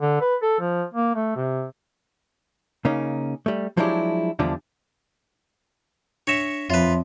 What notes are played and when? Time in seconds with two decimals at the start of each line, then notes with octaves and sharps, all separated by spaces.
0.01 D3
0.21 B4
0.42 A4
0.60 F3
0.94 A#3
1.15 A3
1.36 C3
2.85 C#3 A#3 C#4 D#4
3.46 G3 A3
3.77 F3 F#3 G#3 D4 E4 G4
4.39 E2 D3 F3 G3 D4
6.27 D4 C#5 E5 A#6 C#7
6.70 F2 F4 B4 C#5 E5 C6